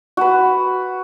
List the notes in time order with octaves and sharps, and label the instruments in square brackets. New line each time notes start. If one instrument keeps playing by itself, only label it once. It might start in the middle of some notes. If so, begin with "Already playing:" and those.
[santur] F#4 B4